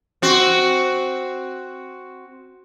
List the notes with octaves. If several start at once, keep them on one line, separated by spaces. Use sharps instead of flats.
C4 F#4